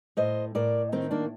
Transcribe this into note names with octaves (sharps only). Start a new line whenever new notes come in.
A2 C5 D#5
A2 A#4 D5
D#3 C4 D#4
A#3 D4